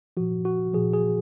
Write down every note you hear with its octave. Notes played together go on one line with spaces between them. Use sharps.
A#2 F3 F#4
F#4
A#2 F3 G#4
G#4